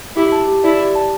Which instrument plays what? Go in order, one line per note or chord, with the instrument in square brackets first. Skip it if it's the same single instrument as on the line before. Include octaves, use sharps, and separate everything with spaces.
[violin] E4 [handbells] G4
[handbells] A5
G4
[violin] E4 [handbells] D5
[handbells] G4
A5